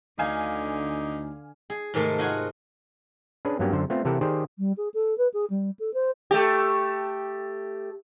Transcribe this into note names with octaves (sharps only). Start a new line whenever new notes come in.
D2 D3 D#4 F5 G#5
G#4
G#2 C3 D#3 G#3 A3
D#4 F4 F#4 F#5 G#5
C#4 D4 G#4 B4
G2 F#3 A#3 B3 C#4 G4
F#2 D3 C5
A3 B3 C4 F4
C3 E3 G4 A4 A#4 F#5
D#3 G4 G#4 C5 D5
G3
G#4
A4
B4
G#4
G3
A4
C5
A3 G4